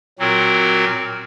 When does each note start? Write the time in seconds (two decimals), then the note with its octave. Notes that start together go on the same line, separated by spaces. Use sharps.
0.19 A#2 F#3 C4 F#4 A#4